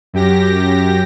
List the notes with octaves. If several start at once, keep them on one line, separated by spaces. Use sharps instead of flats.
F#2 G4 A#6